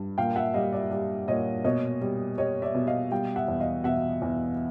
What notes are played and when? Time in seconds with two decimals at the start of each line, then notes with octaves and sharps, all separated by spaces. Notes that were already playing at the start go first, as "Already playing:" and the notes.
Already playing: G2
0.18 A#2 F5 G5
0.36 E5 F#5
0.54 G3 D#5 F5
0.72 D5 E5
0.91 G3
1.28 A#2 C#5 D#5
1.64 B2 C#5 D#5
2.01 G3
2.38 G3 C#5 D#5
2.62 D5 E5
2.75 B2
2.87 D#5 F5
3.11 G3 F5 G5
3.36 E5 F#5
3.48 E2
3.60 D#5 F5
3.84 B2 E5 F#5
4.22 E2